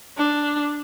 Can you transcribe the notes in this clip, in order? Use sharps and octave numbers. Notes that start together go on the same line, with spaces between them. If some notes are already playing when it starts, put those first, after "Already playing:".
D4